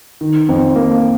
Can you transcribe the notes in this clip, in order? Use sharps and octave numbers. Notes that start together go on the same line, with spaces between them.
D#3
F2
A#3